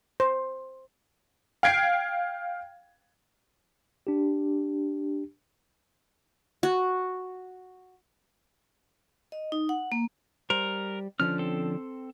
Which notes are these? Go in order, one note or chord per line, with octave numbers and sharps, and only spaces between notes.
C5
F5 G5 G#6 C7 D7
D4 G4
F#4
D#5
D#4
F#5
A#3
G3 A#4 C5
D3 F3 C#4 F6
C4 A4